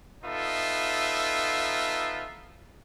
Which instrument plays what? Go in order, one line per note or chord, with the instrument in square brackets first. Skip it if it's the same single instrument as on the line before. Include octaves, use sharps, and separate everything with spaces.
[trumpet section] B3 D#4 F4 A4 E5